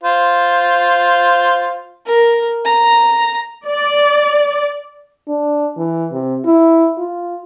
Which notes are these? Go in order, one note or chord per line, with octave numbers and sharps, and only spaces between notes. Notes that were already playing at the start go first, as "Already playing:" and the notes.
F4 C5
A#4
A#5
D5
D4
E3
C3
E4
F4